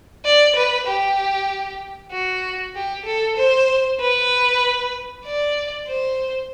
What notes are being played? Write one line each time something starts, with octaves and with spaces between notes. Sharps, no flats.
D5
B4
G4
F#4
G4
A4
C5
B4
D5
C5